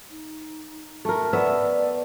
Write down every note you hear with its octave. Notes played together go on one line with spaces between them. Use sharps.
D#4
A3 A#4
A3 B3 D5 E5